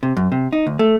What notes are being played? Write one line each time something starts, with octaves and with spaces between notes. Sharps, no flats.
C3
F#2
C3
D#4
D2
A3